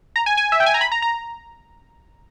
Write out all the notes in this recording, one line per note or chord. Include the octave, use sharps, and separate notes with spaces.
A#5
G#5
G#5
E5
G5
G#5
A#5
B5
A#5
A#5